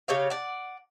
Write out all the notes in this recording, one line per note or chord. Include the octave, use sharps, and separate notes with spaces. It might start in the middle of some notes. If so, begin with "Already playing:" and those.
C#3 G4 C#5 F5
D5 F#5